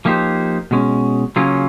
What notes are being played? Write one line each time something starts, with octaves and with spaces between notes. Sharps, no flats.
F3 A#3 D#4 G4 C5
B2 G#3 C#4
C#3 F#3 A#3 C#4 F4